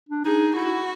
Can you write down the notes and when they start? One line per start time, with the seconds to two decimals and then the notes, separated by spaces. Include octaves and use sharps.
0.09 D4
0.25 D#4 G#4
0.55 E4 F#4